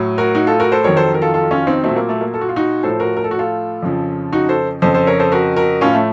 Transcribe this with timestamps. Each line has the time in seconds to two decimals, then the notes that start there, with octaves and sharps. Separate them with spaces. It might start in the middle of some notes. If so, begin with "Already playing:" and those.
Already playing: A2 F#3
0.18 F#4 A#4
0.35 D#4 F#4
0.47 F4 A4
0.60 F#4 A#4
0.72 A4 C5
0.84 F2 D#3 F#3 A#4 C#5
0.97 A4 C5
1.14 A#4
1.22 F4 A4
1.34 F4 A4
1.51 C#4 F4
1.67 C4 D#4
1.84 A#2 F#3 A3 C4
1.96 A#3
2.09 A3
2.21 A#3
2.34 A4
2.41 F#4
2.49 F4
2.56 D#4 F#4
2.83 A2 F3 A4 C5
3.00 F#4 A#4
3.17 A#4
3.24 A4
3.31 F#4
3.39 F4 A4
3.82 F2 C#3 F3
4.32 D#4 F#4
4.49 A4 C5
4.82 F2 C#3 F3 A4 C5
4.94 A4 C5
5.07 A#4 C#5
5.19 A4 C5
5.32 F#4 A#4
5.56 F#4 A#4
5.81 A2 F3 C#4 F4
5.94 A3